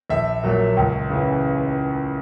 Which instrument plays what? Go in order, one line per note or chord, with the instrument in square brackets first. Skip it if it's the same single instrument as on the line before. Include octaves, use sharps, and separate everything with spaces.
[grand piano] A#1 E5
A#2 F#3
C#2
C#3 E3